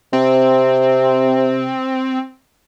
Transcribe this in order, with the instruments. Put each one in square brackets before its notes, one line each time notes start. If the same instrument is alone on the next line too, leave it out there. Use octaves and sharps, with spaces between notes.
[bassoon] C3 [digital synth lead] C4